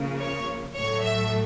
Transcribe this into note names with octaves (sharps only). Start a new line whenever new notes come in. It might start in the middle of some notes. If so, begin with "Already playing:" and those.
Already playing: C#3 F3 A#3
C#5
A2 F#3 A3 C#5
E5